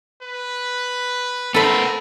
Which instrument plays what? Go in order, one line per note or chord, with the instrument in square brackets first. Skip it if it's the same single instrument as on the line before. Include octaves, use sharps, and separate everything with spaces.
[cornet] B4
[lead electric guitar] B3 C5 [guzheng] A4 B5 [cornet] A#4